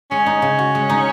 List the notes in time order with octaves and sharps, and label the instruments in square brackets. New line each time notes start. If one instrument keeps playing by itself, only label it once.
[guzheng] G#3 [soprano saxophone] C#4
[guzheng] D#4
C#3
F#4
G#3
D#4